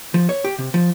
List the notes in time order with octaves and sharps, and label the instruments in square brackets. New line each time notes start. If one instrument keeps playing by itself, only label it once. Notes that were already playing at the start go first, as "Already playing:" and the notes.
[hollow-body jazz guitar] F3
C#5
G4
C3
F3